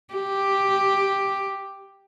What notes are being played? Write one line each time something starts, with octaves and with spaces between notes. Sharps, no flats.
G4